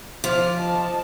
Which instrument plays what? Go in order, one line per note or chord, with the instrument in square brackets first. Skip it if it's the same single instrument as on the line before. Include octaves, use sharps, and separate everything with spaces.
[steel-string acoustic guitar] F3 [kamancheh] D6 F6
[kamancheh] D#5 A5